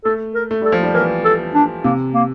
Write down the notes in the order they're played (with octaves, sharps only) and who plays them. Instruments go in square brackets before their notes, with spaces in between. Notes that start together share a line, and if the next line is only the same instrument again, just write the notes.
[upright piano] A3 [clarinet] A4
[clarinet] A#4
[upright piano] A3
[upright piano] G3 [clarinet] A4
[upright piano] F3
G3
[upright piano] E3 [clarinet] A#4
[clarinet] A4
D4
[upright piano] C3 [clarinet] A#3
[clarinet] A#3